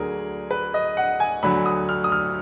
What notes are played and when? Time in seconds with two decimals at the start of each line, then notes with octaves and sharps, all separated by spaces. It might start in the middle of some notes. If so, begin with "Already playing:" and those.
Already playing: D2 D3 F#3 G#4 A#4
0.51 B4
0.74 D#5
0.97 F#5
1.20 G#5
1.43 D2 D3 F#3 B5
1.66 D#6
1.89 F6
2.04 D#6
2.12 F6